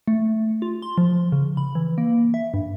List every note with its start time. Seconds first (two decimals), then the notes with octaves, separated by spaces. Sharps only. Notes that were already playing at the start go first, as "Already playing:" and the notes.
0.08 A3
0.62 F4
0.82 C6
0.98 F3
1.32 C#3
1.57 B5
1.75 E3
1.98 A#3
2.34 E5
2.54 G2